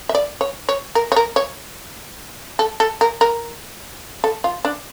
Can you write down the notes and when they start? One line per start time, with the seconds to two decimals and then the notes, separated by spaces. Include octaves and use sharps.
0.09 E5
0.15 D5
0.41 C#5
0.69 C#5
0.95 A#4
1.12 C#5
1.16 A#4
1.36 C#5
2.59 A4
2.80 A4
3.01 A#4
3.21 A#4
4.24 A4
4.44 F4
4.65 D4